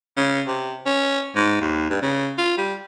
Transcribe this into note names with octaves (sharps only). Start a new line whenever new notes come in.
C#3
C3
C#4
G#2
D#2
G2
C#3
F4
G3